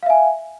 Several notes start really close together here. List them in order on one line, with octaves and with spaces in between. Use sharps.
F5 E5 G#5